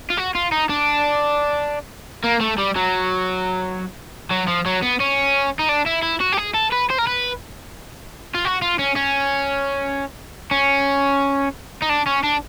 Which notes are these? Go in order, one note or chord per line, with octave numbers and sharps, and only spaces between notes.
F4
F#4
F4
D#4
D4
A#3
A3
G3
F#3
F#3
F3
F#3
B3
C#4
D#4
D4
E4
E4
F#4
G4
G#4
A4
B4
C5
A#4
B4
F4
F#4
F4
C#4
C#4
C#4
D#4
D4
C#4
D4